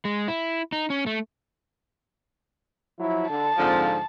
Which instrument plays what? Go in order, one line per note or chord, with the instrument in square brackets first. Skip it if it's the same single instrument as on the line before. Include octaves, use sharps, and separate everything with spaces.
[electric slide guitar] G#3
E4
D#4
C#4
A3
[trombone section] F3 F#3 E4
[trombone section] D3 [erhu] A5
[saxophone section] G#2 D3 F3 [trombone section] C4 F4